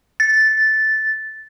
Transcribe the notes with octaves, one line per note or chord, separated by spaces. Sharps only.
A6